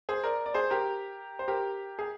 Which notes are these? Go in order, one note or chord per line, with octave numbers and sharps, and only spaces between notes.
G#4 C5
A#4 D5
D5
G#4 C5
G4 A#4
C5
G4 A#4
G#4